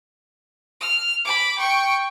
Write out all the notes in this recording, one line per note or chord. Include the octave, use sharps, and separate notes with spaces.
F6
B5 D6
G5 C#6